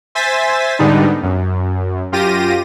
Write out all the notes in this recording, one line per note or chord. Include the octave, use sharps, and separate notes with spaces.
C5 E5 G#5 A6 B6
G#2 D3 G3 B3 D4 D#4
F#2
F#2 F4 G4 A#6 D#7